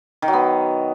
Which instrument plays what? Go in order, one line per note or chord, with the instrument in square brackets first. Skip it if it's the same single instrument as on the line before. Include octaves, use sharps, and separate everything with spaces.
[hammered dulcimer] D#3
F#3
B3